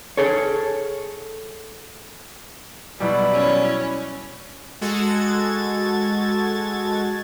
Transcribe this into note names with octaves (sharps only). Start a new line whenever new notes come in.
G#4 A4 C#5
B2 F#3 G3 E4 D5
C#4
G#3 F#4 A4 G#6 A6